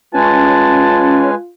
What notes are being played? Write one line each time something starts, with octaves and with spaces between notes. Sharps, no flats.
G#3 C#4 F4 B4 G#5 A5